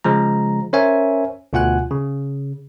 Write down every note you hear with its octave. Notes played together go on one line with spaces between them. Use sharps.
C#3 F3 G#3 A#5
C#4 A#4 C5 C#5 E5 G#5
D2 B2 F4 F#5 G#5 F#6
C#3